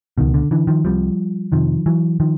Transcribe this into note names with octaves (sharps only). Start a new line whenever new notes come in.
C#2 B2 D#3
D3
D3 E3
D#3 F3
C2 C3 F3 G3
F2 C3 D#3 F3
E3 F#3
D#3 F3